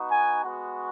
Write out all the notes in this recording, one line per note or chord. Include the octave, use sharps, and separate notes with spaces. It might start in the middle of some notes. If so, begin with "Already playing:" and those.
Already playing: B3 D#4 F#4
G#5
G#3 B3 F#4